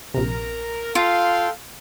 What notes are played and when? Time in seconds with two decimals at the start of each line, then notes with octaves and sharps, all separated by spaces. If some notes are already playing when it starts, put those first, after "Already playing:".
0.14 A#1 C3 A#4 A#5
0.95 F4 A4 F5 G5 C6